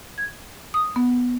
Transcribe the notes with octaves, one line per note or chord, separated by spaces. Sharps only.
G#6
D#6
B3